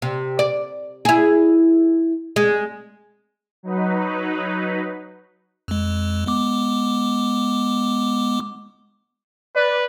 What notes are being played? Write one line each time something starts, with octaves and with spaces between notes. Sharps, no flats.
C3
D5
E4 G#4
G#3
F#3 D#4 B4
F2 G#3
G#3 B3 D6
B4 D5